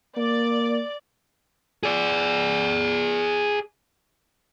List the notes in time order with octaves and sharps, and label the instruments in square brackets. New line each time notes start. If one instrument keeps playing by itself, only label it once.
[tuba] A#3 [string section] D5
[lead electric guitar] G#4 D5